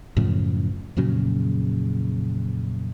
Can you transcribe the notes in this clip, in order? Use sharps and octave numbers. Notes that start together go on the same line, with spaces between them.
F#2 A2 C#3 F3
F2 A#2 C#3 F#3